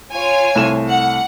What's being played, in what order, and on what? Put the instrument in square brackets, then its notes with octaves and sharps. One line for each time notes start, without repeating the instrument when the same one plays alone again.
[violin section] F4 C#5 G#5
[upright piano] C2 A3 E7
[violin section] F#5